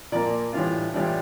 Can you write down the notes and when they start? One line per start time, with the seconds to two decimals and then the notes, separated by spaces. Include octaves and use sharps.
0.12 A#2 F3 A#3 D5
0.53 A2 E3 G3 D4 F4
0.94 A2 E3 G3 D4 F4 D5